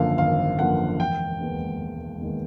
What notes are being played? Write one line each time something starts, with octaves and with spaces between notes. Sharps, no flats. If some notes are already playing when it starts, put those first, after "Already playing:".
Already playing: G#1 F#2 D3 F3 A#3 F5
G#1 F5
F#2 D3 F3 A#3 F#5
E1 G5
D#2 D#3 G#3 B3
E1
D#2 D#3 G#3 B3